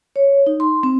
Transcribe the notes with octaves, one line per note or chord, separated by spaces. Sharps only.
C#5
D#4
C6
C4